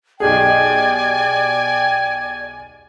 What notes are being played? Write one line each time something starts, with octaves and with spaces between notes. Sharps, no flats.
B1 G4 G#4 D5 G5 G#5